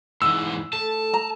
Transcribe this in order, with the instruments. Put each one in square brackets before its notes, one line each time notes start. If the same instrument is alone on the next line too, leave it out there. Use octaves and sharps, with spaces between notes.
[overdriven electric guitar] G#2 E3 [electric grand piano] E6
[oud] A3 [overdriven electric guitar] A5
[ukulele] A#5